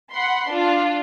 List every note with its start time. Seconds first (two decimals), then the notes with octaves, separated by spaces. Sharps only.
0.12 F#5 B5 C6
0.50 D4 F4